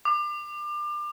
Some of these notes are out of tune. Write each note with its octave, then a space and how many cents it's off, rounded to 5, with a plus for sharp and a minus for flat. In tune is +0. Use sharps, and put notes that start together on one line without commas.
D6 +30